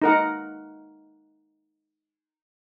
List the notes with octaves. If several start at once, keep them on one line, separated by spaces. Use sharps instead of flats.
D#4 A#4 F#5